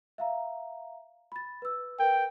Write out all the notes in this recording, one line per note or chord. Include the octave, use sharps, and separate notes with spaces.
E5 F5 A#5
B5 A6
B4 E6
A#4 B4 G5